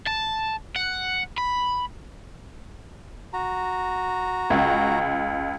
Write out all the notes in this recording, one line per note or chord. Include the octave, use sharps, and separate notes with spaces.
A5
F#5
B5
F#4 A#5
C#2